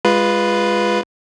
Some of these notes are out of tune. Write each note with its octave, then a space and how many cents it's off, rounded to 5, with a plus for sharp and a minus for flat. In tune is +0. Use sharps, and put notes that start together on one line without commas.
G#3 -20 F4 +0 B4 +0